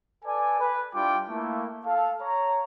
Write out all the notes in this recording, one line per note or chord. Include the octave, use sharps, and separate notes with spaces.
A4 B4 D5 G#5
B4
G3 D4 E4 F4 G5 D6
A3 A#3 E4
A4 F5
C#5 A#5